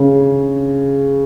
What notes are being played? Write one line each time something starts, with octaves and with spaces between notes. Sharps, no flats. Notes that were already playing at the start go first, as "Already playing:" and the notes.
Already playing: C#3